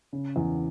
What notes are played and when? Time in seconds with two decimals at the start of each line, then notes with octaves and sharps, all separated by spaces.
0.13 C#3
0.36 E2